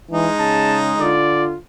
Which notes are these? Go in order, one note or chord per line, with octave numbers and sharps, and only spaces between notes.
E3 G#3 D#4
C#3 A5
D3 F4 D5